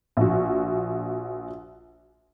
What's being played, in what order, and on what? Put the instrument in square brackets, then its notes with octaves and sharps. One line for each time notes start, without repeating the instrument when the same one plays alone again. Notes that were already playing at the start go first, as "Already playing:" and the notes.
[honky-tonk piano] A#1 F#4